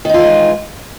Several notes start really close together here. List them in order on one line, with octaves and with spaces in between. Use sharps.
D#3 D#4 F4 E3 G#3